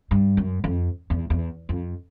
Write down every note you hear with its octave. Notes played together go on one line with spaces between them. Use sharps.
G2
F#2
F2
E2
E2
F2